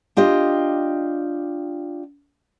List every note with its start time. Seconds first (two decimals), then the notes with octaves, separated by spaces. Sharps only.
0.17 D4 F4 G4 D#5